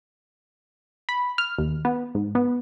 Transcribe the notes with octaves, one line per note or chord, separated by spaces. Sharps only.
B5
F6
D#2
B3
G#2
B3